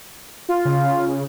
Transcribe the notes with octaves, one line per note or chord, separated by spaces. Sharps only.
F4
C#3